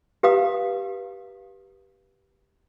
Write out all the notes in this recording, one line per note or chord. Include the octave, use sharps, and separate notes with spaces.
G4 B4 F5 A#5 D#6